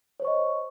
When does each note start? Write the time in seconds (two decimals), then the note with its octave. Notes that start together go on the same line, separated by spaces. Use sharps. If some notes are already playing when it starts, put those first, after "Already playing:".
0.20 C#5
0.22 C5
0.25 C#6
0.27 D#5